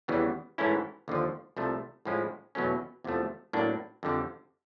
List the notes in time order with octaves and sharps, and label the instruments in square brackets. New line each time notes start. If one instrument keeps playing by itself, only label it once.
[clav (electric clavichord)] E2 C#3 E3 G3 B3
G#2 E3 A3 C#4 E4
D#2 D3 F3
C2 C3 F3 A3
A2 F3 G#3 C#4 E4
E2 B2 F#3 A3 C#4
E2 C3 F3 A3
A2 F#3 A#3 D4
F2 D3 G3